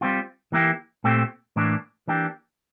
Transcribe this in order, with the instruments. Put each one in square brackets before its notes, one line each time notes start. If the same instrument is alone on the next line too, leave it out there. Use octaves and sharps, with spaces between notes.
[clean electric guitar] G3 C4 F4
E3 A#3 E4 G4
A#2 A3 C4 G4
A2 E3 A#3 D4
E3 A#3 D4 G4